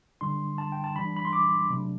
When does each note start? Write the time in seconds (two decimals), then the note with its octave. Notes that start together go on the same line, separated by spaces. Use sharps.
0.21 D3 G3 D4 C6
0.58 A5
0.72 G5
0.84 A5
0.95 E3 G3 D4 B5
1.17 B5
1.25 C6
1.33 D6
1.70 C3 F#3 A3 D4